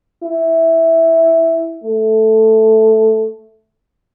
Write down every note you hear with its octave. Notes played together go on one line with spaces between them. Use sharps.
E4
A3